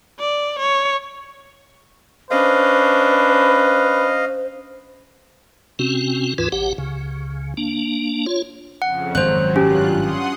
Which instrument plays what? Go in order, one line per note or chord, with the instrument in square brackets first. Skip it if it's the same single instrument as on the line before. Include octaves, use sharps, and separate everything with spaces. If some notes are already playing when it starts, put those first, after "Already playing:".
[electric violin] D5
C#5
[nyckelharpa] C#4 D4 [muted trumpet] B4 [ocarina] C5 [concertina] D#5 F5
[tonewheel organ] C3 C4 C#4 F#4
D2 G#2 E3 F4 B4
A1 G4 F#5
C#2 C#3
A#3 D4
F4 C#5
[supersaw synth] F2 C#3 [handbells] F#5
[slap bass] G#1 F#2 [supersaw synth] F#3 [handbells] C5 F#6
[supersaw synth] G2 F4 F#6 [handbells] C#4 [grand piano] G4
[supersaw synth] F#5 C6 D#6